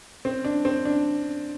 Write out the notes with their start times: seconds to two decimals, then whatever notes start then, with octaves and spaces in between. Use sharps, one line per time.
0.25 C4
0.45 D4
0.65 C4
0.85 D4